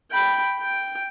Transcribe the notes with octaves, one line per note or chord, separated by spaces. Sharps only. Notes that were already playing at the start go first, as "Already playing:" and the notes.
G5 B5
G5